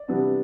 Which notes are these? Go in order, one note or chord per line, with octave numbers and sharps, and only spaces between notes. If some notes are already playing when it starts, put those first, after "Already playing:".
Already playing: D5
C3 E3 G3 B3 D4